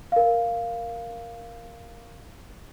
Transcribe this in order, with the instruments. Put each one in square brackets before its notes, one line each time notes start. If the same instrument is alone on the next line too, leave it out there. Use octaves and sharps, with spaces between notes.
[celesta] A#4 F5